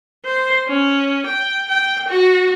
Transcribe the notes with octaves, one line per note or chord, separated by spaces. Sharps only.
C5
C#4
G5
G5
F#4